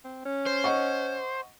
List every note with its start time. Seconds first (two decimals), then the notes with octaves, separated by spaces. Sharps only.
0.05 C4
0.25 C#4
0.46 C5
0.64 D#5 F#5 C#6